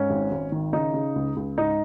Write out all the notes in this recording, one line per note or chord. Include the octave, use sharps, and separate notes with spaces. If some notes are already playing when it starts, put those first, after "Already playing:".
Already playing: G#2 C#4
G#1
G#1
D#3
C#3 D#4
C#3
C#2
C#2
G#2 D#4